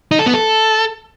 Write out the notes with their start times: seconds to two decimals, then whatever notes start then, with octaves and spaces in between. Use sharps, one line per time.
0.11 D#4
0.19 A4
0.26 B3
0.34 A4